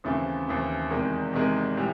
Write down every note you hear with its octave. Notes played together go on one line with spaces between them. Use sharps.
D#2 C#3 E3 A3 C4
D#2 C#3 E3 A3 C4
E2 C3 D#3 G#3
E2 C3 D#3 G#3
A2 E3 G3